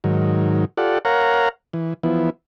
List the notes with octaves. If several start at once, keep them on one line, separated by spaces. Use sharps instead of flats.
G#2 D#3 F#3
F4 G4 A4 D5 F#5
A#4 C#5 F5 F#5 A#5
E3
E3 F3 B3 E4